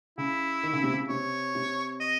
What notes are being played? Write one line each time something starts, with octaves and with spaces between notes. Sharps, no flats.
C#3 E4
D#3
C#3
C3
C#3
C3 C#5
C3
D#5